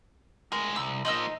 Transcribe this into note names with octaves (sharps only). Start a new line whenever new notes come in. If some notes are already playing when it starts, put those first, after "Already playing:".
A2 G#3 A#4
C2 E6
F3 A#3 D#4 D#5 E6